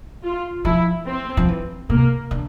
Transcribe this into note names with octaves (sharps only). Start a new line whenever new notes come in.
F4
F3 E4
C4
F3
E3
C3 A#3
D3